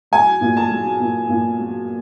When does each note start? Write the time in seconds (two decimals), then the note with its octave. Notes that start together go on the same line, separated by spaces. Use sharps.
0.12 F#3 G#5
0.41 A#2
0.57 A5
0.71 F#3
1.00 A#2
1.29 A#2
1.58 F#3